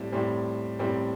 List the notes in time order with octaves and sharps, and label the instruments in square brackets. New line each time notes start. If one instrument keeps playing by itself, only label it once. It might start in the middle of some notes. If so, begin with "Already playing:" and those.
Already playing: [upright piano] A2 G3 C4
A2 G3 C4
A2 G3 C4